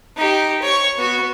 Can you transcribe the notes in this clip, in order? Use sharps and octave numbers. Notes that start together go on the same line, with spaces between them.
D#4 G4
C#5 C#6
B3 F#4